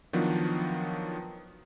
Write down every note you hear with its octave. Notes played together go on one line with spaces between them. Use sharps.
D#3 F3 F#3 B3 D4